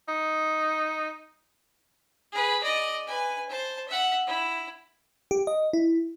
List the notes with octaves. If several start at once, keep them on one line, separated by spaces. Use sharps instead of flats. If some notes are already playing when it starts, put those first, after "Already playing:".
D#4
G#4 B4
D5 D#5
B4 G#5
C5 A5
E5 F#5
E4
G4
D#5
E4